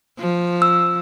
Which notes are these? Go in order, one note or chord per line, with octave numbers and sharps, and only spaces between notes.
F3
E6